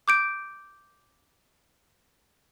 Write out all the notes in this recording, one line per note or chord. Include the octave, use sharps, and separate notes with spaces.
D6 G6 D7